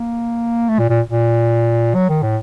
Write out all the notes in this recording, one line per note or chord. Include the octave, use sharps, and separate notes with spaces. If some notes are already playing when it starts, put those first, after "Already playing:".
Already playing: A#3
A3
A#2
A#2
A#2
F#3
D#3
A2